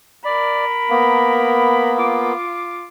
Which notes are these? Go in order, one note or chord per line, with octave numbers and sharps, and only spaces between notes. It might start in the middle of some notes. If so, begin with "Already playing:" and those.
A#4 D5 B5
A#3 B3
F4 D6